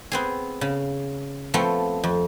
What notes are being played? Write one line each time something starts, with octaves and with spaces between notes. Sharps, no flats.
B3 C4 G#4
C#3
F3 A3 B3 C4
F2